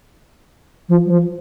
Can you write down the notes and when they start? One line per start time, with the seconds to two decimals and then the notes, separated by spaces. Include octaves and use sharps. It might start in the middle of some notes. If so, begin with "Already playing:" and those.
0.89 F3
1.06 F#3
1.10 F3